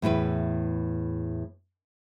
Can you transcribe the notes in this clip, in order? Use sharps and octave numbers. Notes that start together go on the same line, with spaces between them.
E2 A2 E4 B4